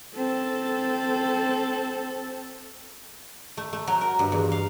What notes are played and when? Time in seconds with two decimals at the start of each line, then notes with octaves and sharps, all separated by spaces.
0.16 C4 A4
3.57 A3
3.73 A3
3.87 F#3
4.01 A#4
4.19 G2
4.32 E2
4.52 F5